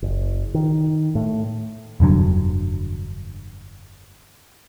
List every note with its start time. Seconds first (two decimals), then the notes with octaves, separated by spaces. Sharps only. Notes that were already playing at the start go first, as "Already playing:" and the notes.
0.02 F#1
0.54 D#3
1.15 A2
2.00 F1 G2 D3 F#3